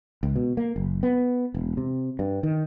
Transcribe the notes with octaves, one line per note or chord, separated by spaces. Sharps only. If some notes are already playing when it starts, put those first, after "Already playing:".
C#2
B2
A#3
F#1
B3
E1
C3
G2
D#3